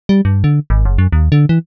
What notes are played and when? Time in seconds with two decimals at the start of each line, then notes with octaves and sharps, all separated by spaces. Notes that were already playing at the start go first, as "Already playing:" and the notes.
0.09 G3
0.25 G2
0.44 D3
0.70 G#1
0.85 F#1
0.98 F#2
1.12 D#2
1.32 D3
1.49 E3